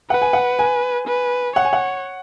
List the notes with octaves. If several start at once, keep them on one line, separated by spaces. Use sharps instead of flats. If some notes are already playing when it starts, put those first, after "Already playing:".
B4 F#5
G#5
F#5
G#5
B4
C#5 F#5
G#5
F#5